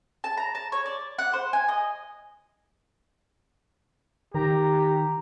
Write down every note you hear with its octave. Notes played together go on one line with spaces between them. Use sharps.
A5
A#5
A5
C#5
D5
F#5
C5
G#5
D#5
D#3 G4 A#5